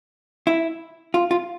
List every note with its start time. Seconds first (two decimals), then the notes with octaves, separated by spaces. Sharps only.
0.47 E4
1.14 F4
1.31 F4